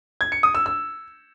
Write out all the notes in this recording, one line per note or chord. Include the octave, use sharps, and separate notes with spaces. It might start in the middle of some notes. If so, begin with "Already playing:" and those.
G#6
C#7
D#6
E6
E6